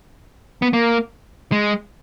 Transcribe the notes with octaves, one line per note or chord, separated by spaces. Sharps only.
B3
A#3
G#3